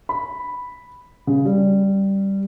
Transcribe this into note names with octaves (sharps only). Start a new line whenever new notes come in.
B5
C#3
G3